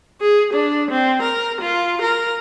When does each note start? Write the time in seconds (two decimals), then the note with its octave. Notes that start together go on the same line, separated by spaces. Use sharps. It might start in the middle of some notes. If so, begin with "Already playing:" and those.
0.21 G#4
0.53 D4
0.91 C4
1.22 A#4
1.61 F4
2.02 A#4